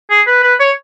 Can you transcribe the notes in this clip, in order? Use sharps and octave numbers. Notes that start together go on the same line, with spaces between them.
G#4
B4
B4
C#5